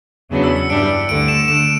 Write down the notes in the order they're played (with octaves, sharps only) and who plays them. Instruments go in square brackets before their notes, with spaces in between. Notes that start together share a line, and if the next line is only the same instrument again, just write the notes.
[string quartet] E2 C#3 F#3 B3 D4
[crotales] E6
C#7
[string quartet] G2 E3 G3 D4 G4 [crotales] D7
[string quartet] D2 D3 A3 [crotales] D7
[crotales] E7
[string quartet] D3 A3 [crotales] E7